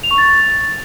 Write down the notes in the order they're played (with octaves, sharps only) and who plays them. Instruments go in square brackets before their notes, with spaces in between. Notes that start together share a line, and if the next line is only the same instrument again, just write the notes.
[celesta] F7
C#6
A6